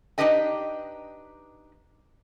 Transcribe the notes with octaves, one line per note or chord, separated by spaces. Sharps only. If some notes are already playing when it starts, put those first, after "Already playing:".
D4 D#4 G4 B4 D#5 G5